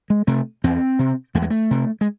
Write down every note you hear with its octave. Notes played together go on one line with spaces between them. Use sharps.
G#3
C3 A3
E2 C4
C3
E2 A3
G#3
A3
C3
G#3